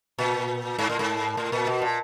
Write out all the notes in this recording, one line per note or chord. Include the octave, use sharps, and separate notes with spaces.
A#2
G#2
A2
G#2
A2
A#2
B2
A#2